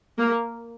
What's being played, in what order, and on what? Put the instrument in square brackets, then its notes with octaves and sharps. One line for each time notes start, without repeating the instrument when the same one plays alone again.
[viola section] A#3